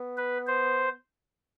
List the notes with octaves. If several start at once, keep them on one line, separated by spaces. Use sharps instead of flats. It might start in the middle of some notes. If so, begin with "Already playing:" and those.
Already playing: B3
B4
C5